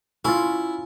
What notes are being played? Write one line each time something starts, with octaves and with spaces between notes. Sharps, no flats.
C#4 E4 F4